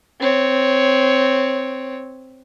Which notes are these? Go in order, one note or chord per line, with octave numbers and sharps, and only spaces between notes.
C4 C#5